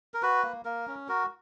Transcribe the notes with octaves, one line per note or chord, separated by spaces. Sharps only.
A#4
F#4 B4
A#3
A#3 A#4
C#4
F#4 A#4